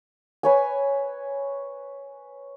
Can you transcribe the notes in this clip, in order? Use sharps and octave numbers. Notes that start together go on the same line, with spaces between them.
B4 C#5 G#5